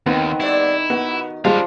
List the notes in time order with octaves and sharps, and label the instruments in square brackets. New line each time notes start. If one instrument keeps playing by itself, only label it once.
[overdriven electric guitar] D#2 [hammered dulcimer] D#3 [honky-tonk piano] B3 C4
[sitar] G3 D5 [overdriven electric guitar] E4
[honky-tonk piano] B3 [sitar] F#4
[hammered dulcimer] F3 [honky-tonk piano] G3 G#3 [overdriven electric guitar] D4 F5